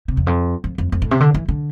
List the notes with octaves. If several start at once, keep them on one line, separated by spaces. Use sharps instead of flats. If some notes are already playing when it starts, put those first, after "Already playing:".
C3
E2
F2
F2
F2
F2
A2
C3
D3
E3
D3